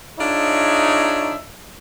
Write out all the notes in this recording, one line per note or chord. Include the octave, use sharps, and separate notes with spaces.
D4 D#4 F4 G#4 C#5 E5